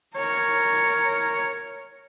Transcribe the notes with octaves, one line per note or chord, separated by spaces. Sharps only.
A#4 C#5